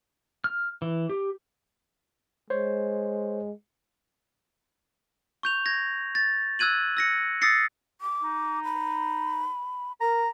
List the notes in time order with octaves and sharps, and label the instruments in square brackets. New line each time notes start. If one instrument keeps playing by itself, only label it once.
[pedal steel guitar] F6
E3
G4
[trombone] G#3 [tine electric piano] C5 C#5
[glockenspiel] C#6 G6 F7
G#6 A#6
A6
E6 F#6 G#6 D#7 F#7
E6 A#6 C#7
D#6 E6 A6 A#6 C7 C#7
[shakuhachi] D6
[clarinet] D#4
[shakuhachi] B5
[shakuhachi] A#4 [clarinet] A#5